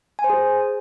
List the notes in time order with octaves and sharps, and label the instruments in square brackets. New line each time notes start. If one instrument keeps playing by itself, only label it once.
[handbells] G#5
C5
G#4